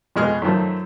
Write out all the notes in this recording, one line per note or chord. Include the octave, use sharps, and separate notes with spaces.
F2 B2 G#3 G#4 F6
F#2 D#3 F3 A3